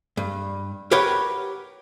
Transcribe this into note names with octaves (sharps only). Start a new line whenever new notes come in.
G2
G4 A#4 B4 C#5 F#5 G5